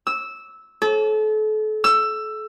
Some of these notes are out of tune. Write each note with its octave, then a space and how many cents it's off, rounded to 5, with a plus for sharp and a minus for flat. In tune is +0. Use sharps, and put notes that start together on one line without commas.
E6 -10
A4 -35
E6 +15